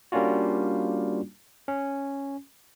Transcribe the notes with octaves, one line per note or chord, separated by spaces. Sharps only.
G3 A#3 C#4 D4 F4 F#4
C#4